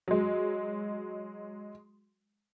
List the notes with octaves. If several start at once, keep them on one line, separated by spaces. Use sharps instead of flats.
F#3 G#3